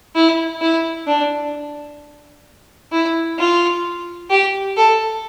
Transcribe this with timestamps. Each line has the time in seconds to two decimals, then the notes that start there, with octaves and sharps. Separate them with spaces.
0.15 E4
0.61 E4
1.07 D4
2.92 E4
3.38 F4
4.30 G4
4.76 A4